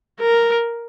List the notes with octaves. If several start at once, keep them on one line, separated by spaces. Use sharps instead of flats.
A#4